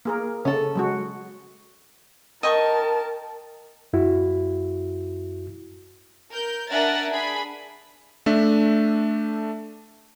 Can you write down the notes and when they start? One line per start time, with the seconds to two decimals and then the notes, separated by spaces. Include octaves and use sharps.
0.05 A#3 G#4 A#4
0.45 C#3 C#4 A4
0.75 F#3 G#3 F#4
2.43 A#4 D#5 G5 A5 C#6
3.93 F#2 E4 F#4
6.31 A#4 G6
6.70 D4 A#4 E5 F#5 G#5 A6
7.10 D4 G#4 B5
8.26 A3 D4 E5